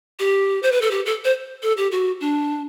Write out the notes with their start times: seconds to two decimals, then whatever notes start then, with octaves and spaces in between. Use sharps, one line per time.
0.20 G4
0.63 C5
0.72 B4
0.82 A4
0.91 G4
1.06 A4
1.25 C5
1.63 A4
1.77 G4
1.92 F#4
2.21 D4